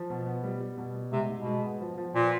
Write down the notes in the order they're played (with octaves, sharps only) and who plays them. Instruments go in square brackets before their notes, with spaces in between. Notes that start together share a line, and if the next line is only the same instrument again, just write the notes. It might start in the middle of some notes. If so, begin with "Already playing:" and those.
Already playing: [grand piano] F3
B2
B3
G3
G3
B2
G3
[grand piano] G#2 [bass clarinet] C3
[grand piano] G#2
[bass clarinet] B2
[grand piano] G#3
B3
F3
F3
[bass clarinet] A#2 [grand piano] B3